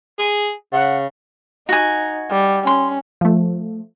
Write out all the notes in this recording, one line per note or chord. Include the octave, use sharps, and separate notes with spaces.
G#4
C#3 F#5
D#4 F#4 G#5
G3
C#4 C6
F3 A3